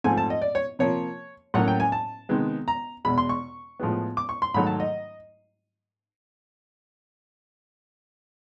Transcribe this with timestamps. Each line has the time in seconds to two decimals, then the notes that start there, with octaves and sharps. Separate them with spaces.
0.04 G#2 F3 A3 C4 G#5
0.18 A5
0.30 D#5
0.42 D5
0.55 C#5
0.79 C3 F3 A#3 C#5
1.54 A2 F#3 A#3 C#4 F#5
1.68 G5
1.80 G#5
1.92 A5
2.29 C3 D#3 G#3 B3
2.68 A#5
3.05 E2 B2 G#3 B5
3.18 C6
3.29 C#6
3.79 A2 F3 G#3 B3
4.17 D6
4.29 C#6
4.42 C6
4.54 G#2 D#3 F#3 A3 B5
4.67 A5
4.80 D#5